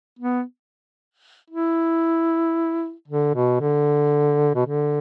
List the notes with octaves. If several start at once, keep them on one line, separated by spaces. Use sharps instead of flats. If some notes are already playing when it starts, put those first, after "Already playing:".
B3
E4
D3
B2
D3
B2
D3